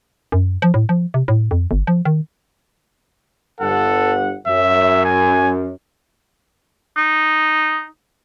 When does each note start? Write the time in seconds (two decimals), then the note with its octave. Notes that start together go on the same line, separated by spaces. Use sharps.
0.32 F#2
0.62 F3
0.74 A2
0.89 F3
1.14 C3
1.28 A2
1.51 F2
1.71 G1
1.87 F3
2.05 D#3
3.61 G1 G2 A4 F#5
4.47 F#2 E5
5.05 G#5
6.97 D#4